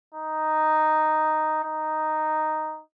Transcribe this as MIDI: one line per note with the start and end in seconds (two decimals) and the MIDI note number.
0.14 1.61 63
1.63 2.81 63